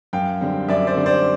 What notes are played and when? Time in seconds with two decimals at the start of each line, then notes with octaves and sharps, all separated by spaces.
0.13 F#2 F5 G5
0.41 D3 G3 C4
0.69 F#2 D5 E5
0.87 C5 D5
0.96 D3 G3 C4
1.06 C5 D5